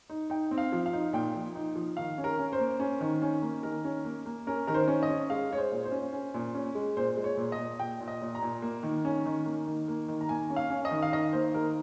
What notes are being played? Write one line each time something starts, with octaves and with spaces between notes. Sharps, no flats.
D#4
D#4 G5
C4
F5
F3
F5
D#4
A#2 G5
F3
D#4
F3
D#3 F5
C#4
A#4
C#4
C5
A#3
C#4
D#3
C#4
A#3
D#3 A#4
C#4
A#3
A#3
C#4 A#4
D#3 A#4
C5
C#4
D#5
C#4
G#3 F5
G#3 C#5
C5
A#2
C5
C#4
C#4
A#2
C#4
G#3
A#2 C5
G#3
C#5
A#2
D#5
A#2
A#2 G5
A#2
D#5
A#2
A#5
A#2
A#3
D#3
C#4
D#3
A#3
D#3
A#3
D#3
A#5
A#3 G#5
C#4
F5
C#4
D#5
D#3
F5
D#3 D#5
A#3 C5
D#3 A#4